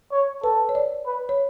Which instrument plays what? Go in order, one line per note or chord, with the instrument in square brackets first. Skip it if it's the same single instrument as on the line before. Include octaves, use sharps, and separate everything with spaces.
[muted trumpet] C#5
[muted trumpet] A4 [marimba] B4
[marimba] C#5
D5
[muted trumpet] B4
[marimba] C#5